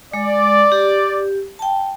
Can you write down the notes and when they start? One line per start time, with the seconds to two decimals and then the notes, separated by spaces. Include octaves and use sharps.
0.14 G#3 D5
0.72 G4
1.59 G5 A5